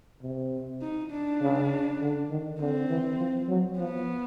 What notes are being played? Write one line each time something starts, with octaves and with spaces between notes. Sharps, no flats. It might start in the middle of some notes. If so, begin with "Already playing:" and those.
C3
D#4
D4
C#3
D3
D#3
D3 C4
E3
F3
F#3
F3 B3